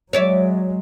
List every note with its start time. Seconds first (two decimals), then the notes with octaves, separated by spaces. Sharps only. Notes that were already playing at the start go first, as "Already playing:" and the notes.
0.13 F#3 G#3 C#5 D5 E5